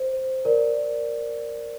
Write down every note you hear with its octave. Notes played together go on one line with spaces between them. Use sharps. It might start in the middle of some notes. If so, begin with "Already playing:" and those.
Already playing: C5
A#4 D5